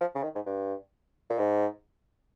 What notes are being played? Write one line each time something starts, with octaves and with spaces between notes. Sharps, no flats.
F3
C#3
D#3
G#2
G2
A#2
G#2